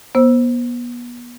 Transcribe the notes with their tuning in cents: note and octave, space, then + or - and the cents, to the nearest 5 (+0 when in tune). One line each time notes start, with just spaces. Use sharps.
B3 -35 C5 +5 E6 +0